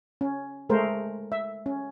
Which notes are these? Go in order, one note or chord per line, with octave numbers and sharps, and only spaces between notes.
C#4
G#3 A3 A#4 C5
E5
C#4